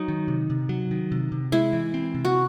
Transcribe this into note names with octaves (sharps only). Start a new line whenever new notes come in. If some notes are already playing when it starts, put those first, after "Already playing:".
Already playing: F#3 D#4
D#3
C3
C3
F#3
D#3
C3
C3
G#3 E4
E3
C4
C3
F#4